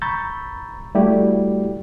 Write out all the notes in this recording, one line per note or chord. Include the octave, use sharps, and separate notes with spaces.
A#5 B5 C#6 E6 G6 A6
G3 A3 E4 F#4 G4 D5